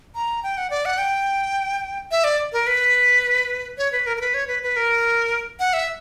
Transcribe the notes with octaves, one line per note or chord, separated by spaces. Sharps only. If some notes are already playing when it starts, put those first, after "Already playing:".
A#5
G5
F#5
D5
F#5
G5
E5
D5
A#4
B4
C#5
B4
A#4
A#4
B4
C#5
B4
B4
A#4
F#5
E5